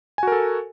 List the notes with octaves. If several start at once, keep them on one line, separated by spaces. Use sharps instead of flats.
F#4 A4 A#4 G#5